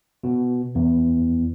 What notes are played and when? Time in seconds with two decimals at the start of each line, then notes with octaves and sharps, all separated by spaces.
0.24 B2
0.75 E2